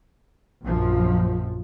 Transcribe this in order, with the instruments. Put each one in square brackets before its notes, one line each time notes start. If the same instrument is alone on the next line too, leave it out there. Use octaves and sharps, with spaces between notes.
[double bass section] A#1 F#2 F3